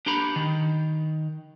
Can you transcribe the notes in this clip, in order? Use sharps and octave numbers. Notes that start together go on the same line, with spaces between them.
D4 G4 A#5 B5
D#3